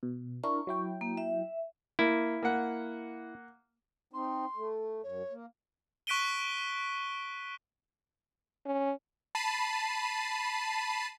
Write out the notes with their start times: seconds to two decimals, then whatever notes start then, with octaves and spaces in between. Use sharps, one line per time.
0.03 B2
0.44 D4 E4 A#4 C#6
0.67 F#3 E4 G5
1.01 A#3
1.17 E5
1.99 A#3 E4
2.43 A#3 F#5
4.13 C4 D#4 C6
4.56 A3
5.03 F#2 C#5
5.31 A#3
6.07 C#6 F#6 B6 D7 D#7 G7
8.66 C#4
9.35 A5 B5 C7 D#7